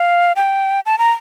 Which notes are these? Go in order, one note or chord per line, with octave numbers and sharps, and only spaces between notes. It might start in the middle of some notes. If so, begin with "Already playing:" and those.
Already playing: F5
G5
A5
A#5